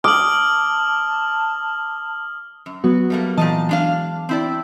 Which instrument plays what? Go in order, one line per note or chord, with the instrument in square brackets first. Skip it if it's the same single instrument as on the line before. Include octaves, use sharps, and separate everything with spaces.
[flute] A5 [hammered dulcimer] D6 [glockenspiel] D#6 [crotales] F6 F#7
[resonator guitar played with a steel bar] F#2
[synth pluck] F#3 B3 F#4
[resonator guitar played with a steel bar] G3 A3 A#3
[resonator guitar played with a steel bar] A#2 D#3 D#5 [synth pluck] E3 A5
[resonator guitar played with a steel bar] G#3 D4 F5
C4 E4 D5